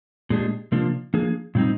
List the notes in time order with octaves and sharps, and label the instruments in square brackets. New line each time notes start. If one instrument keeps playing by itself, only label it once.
[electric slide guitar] A#2 G#3 D4 G4
C3 F3 A#3 D4 F4
F3 A#3 D4 G#4
A#2 G3 C4 D#4